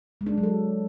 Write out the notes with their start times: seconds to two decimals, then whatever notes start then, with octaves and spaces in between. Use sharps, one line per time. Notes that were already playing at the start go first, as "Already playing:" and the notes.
0.21 G#3
0.26 D4
0.32 G#3
0.38 F#3
0.43 A4